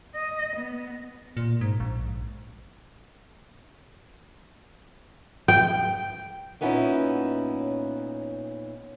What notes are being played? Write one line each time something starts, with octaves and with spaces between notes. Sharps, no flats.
D#5
B3
A#2
G#2
A#1
G5
A#2 B3 C#4 D#4 E4